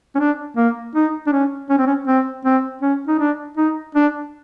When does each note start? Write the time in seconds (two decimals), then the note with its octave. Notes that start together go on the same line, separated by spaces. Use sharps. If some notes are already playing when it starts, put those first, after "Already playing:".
0.15 C#4
0.20 D4
0.57 A#3
0.95 D#4
1.27 D4
1.33 C#4
1.70 C#4
1.78 C4
1.87 C#4
2.07 C4
2.45 C4
2.82 C#4
3.07 D#4
3.20 D4
3.57 D#4
3.95 D4